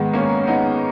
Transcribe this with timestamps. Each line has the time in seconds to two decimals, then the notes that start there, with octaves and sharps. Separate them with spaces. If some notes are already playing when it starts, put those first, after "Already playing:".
Already playing: G#2 D#3 G#3 B3
0.13 A#3 C#4
0.47 B3 D#4